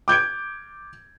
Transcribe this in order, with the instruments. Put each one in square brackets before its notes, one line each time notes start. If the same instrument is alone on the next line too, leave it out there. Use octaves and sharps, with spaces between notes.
[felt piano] D6 G6 G#6 D7